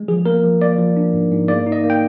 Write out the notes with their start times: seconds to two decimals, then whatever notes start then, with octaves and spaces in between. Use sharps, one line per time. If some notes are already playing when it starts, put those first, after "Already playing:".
Already playing: G#3
0.08 F3 G#4
0.26 A#3 A#4
0.43 F3
0.61 A#3 D5
0.78 F3
0.96 D4
1.13 G#2
1.31 G#2
1.48 A#3 D5
1.66 D#4
1.72 D#5
1.84 A#3
1.90 G5